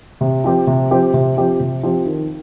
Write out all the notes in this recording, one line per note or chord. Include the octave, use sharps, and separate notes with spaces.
C3
F3 C4 G4
C3
F3 C4 G4
C3
F3 C4 G4
C3
F3 C4 G4
D#3